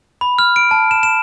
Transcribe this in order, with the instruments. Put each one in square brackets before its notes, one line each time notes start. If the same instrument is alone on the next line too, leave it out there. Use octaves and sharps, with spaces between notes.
[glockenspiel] B5
F6
D7
A5
E7
E7